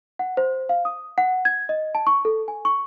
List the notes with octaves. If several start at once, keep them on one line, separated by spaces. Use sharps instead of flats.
F#5
C5
F5
D#6
F#5
G#6
D#5
A5
C#6
A4
G#5
C#6